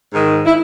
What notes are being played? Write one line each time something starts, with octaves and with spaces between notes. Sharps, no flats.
G#2 D#3
E4